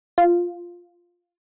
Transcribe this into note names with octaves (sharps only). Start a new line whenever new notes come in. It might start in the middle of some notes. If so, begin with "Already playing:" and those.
F4